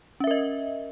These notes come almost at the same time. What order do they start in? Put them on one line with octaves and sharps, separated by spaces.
C#4 E5 A#4 D#5